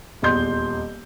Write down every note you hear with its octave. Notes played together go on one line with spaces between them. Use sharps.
D#1 E2 D#5 C6 G6